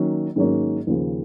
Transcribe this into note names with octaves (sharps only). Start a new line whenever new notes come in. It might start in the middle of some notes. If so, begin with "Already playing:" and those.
Already playing: D#3 F#3 A#3 C#4
G#2 D#3 F#3 A#3 C#4
D#2 C#3 F3